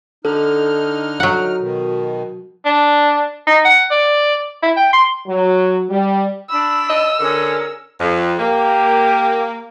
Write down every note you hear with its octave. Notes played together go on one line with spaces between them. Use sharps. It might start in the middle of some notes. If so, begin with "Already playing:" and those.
D3 D#4 A4 F6
F#3 F#5
B2 D#3
D4
D#4
F#5
D5
E4
G5
C6
F#3
G3
D4 B5 E6
D#5
D3 C#4 G#4 A#4
F2
A#3 G4